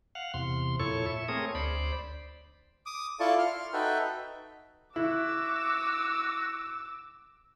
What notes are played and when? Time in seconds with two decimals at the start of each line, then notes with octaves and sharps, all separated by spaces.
0.15 F5 F#5
0.34 E2 C3 C6
0.80 F2 A#2 E4 A4 C#5 C#6
1.06 E5
1.28 A3 C4 G#4 A#4 C#5 D#6
1.55 D2 C5 D5 B5
2.86 D6 D#6
3.20 E4 F4 A4 D5 A5 C#6
3.39 C6 F6
3.73 D#4 F#4 A4 B4 E5 G5
4.96 E4 F#4 D6 E6